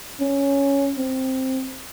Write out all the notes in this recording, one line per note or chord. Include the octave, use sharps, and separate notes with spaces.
C#4
C4